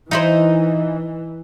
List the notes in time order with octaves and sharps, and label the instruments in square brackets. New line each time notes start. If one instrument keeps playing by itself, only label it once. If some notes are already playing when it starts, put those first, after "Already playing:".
[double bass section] E3 [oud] D#4 E4 C5